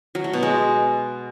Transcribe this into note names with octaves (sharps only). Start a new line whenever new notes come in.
F#3
A3
B2
G#3